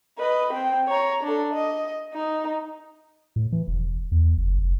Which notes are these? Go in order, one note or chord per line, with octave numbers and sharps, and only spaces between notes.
B4 D#5
C4 G5
C#5 A#5
D4 A4
D#5
D#4
A2
E3
E1
E2
F#1
F1